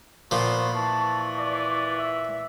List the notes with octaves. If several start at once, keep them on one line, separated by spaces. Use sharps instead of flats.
A#2 F3 B3 C5 C#6
E3 A5
D5
E5